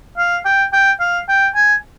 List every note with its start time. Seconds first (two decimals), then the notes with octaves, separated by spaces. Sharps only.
0.18 F5
0.45 G5
0.73 G5
1.00 F5
1.29 G5
1.55 G#5